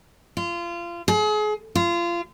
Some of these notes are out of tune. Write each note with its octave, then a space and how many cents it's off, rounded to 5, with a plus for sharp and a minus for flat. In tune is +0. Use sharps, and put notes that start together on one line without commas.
F4 -25
G#4 +35
F4 -25